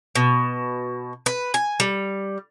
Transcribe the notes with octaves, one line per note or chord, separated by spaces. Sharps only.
B2
B4
G#5
G3